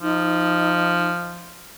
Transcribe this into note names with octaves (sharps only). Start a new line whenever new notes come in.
F3 D#4